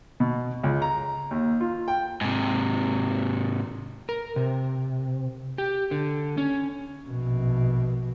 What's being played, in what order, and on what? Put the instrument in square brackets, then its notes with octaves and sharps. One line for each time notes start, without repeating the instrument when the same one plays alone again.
[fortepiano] B2
C#2
A#5
D#2
F4
G5
[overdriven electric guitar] G#2 C3
[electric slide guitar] A#4
C3
G4
D3
C#4
[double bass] A#1 B2